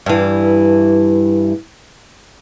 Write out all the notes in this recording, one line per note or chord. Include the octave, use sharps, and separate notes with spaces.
G2 E3